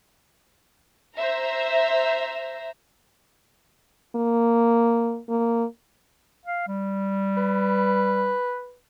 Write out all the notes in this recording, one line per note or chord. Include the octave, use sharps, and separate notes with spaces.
C5 E5 A#5
A#3
A#3
F5
G3
B4